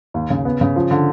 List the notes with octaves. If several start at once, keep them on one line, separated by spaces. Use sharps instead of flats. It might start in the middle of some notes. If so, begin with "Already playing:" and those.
D#2
C#3
B3
C#3
F3
D3